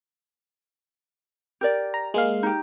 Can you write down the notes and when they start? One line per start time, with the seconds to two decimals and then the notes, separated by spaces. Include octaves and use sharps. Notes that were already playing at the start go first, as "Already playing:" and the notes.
1.61 G4 A#4 D5
1.94 A#5
2.14 G#3 A#3 F5
2.43 D#4 G4